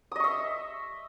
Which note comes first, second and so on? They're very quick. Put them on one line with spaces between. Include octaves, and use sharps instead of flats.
D#6 D#5 C#6 E5